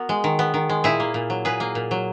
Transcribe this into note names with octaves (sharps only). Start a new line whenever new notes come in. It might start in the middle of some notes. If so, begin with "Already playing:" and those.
Already playing: B3 F#4 A#4
G#3
D#3
B3
D#3
G#3
A#2 E4 G#4
A#3
A#2
F#3
A#2 G#4 B4
A#3
A#2
F#3